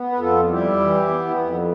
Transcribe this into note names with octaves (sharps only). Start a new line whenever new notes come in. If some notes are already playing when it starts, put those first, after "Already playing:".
Already playing: B3
B4
F2 F4 A4
G3 E4 G4
E3
B3
F2